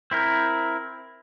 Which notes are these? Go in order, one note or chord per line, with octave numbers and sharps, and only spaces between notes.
C4 E4 A#4